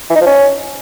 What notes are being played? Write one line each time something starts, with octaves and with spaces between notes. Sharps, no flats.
E3
D#4
F3
C#4